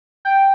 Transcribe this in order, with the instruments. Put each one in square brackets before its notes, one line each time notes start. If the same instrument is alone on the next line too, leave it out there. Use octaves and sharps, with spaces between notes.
[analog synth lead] G5